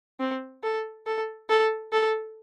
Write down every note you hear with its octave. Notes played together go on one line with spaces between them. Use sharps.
C4
A4
A4
A4
A4